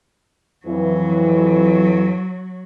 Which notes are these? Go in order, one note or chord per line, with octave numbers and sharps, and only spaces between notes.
F2 E3 F#3